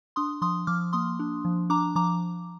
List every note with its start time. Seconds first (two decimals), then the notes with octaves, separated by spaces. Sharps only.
0.16 D4 C6 D#6
0.42 F3 C6 D#6
0.67 F3 D6 F6
0.93 A#3 C6 D#6
1.19 D4
1.45 F3
1.70 D4 A#5 D6
1.95 F3 A#5 D6